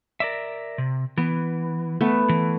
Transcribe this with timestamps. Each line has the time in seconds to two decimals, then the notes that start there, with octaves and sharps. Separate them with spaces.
0.20 A#4 D5 E5
0.78 C3
1.17 E3 B3
2.01 A3 B3
2.29 E3